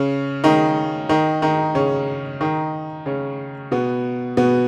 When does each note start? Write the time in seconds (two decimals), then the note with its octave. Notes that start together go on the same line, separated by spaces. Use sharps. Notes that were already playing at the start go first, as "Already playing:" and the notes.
Already playing: C#3 C#4
0.44 D#3 D#4
1.09 D#3 D#4
1.42 D#3 D#4
1.75 C#3 C#4
2.41 D#3 D#4
3.06 C#3 C#4
3.72 B2 B3
4.37 B2 B3